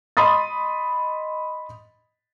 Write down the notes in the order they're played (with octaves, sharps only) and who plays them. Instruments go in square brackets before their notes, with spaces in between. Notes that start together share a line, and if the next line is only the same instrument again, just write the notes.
[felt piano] D#5 B5 C6 D#6 A6